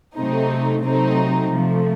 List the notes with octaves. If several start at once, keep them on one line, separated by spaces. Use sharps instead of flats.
C3 F#3 A3 C4 D#4
C3 F#3 A3 C4 D#4
C3 F3 A3